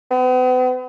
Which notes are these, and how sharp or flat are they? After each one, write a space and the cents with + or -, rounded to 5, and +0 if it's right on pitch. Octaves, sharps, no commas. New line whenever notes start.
B3 +45